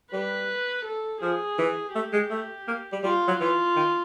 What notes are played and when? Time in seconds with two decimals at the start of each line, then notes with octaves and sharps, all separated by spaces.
0.13 G3 B4
0.85 A4
1.22 F3 G#4
1.58 E3
1.95 A3 G4
2.13 G#3
2.31 A3
2.68 A#3
2.92 G3
3.04 G3 F4
3.28 F#3
3.40 E3 F4
3.76 D#3